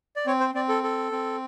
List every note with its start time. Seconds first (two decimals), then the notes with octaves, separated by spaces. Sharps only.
0.16 D5
0.26 C4 C#5
0.40 C5
0.54 C4 D5
0.69 A4
0.83 A4
1.12 C4